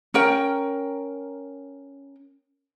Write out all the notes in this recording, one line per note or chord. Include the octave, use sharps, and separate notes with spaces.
C#4 A#4 G5